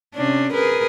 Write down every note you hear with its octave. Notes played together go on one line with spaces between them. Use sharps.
C3 C#4 D4
G#4 A#4 B4